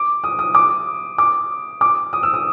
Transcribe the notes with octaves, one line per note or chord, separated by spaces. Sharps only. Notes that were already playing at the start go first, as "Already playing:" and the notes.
Already playing: D6
D#6
D#6
D6
D6
D6
D#6
E6
D#6